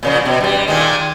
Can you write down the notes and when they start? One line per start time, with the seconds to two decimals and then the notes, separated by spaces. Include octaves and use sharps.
0.03 A#2 C#3 F3
0.25 B2
0.41 G2 G3
0.68 A#2 D#3 G#3